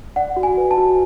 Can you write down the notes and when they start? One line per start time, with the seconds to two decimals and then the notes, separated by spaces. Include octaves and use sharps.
0.16 D5 F#5
0.37 F#4
0.43 G#5
0.57 B4
0.71 A5
0.77 F#4